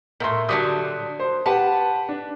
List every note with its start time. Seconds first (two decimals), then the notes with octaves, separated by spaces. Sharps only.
0.20 A2 C3 A#4 E5 C6
0.49 D3 F#3 G3 D#6 B6
1.20 C5
1.46 G4 B4 F#5 A5
2.09 D4